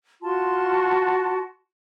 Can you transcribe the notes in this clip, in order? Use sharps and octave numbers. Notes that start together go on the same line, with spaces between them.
F4 F#4 A5 C6